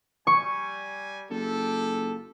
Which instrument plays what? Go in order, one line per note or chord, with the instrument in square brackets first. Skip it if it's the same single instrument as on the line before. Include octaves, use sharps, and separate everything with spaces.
[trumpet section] G3 G#5 [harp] C#6
[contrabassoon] F#1 [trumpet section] F4 G4 A4